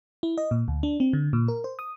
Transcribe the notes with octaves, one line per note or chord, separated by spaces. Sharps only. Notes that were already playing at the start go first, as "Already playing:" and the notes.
E4
D#5
A#2
D2
D4
C4
D3
A#2
A#4
C5
D#6